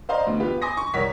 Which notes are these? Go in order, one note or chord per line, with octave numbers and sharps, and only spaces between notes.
C5 D5 D#5 F5 A#5 C6
D2 B3
B3 F4 G4 B4
G#5 C6 D6 D#6 A#6
C#6
C2 A#4 C#5 F#5 B6